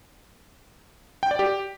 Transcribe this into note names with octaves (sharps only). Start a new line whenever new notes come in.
G5
D5
G4